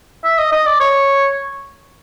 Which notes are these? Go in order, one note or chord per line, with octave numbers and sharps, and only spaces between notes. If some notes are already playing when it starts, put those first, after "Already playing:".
E5
D#5
D#5
D5
C#5